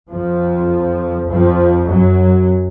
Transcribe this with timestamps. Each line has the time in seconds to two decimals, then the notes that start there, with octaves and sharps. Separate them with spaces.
0.11 F2 F3
1.30 F2 F3
1.90 F#2 F#3